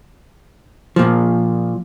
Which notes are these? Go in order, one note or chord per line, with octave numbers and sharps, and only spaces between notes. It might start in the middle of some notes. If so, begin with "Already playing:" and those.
A#2 F3